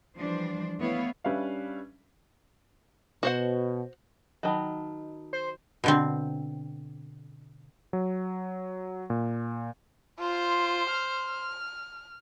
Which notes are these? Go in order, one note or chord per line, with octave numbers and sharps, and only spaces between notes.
E3 F3 G3 D4 C5
A3 B3 E4 C#5 E5 F5
G3 C#4 D4 B4 E5 F5
B2 F#4 C5 F#5
D#3 F#3 D#5 A5 B5
C5
B2 D3 C4
F#3
A#2
F4 C5
F6